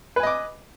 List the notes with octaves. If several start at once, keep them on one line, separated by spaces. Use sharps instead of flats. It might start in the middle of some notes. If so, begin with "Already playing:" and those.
B4 D#5 G#5 D6